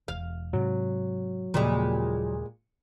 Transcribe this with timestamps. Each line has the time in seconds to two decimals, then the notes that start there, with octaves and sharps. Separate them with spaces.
0.08 E1 F5
0.53 G#2 C3 F#3
1.54 D#1 A#2 C#3 F3 G3 G#3